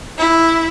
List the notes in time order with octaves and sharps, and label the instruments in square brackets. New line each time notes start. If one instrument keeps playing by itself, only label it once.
[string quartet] E4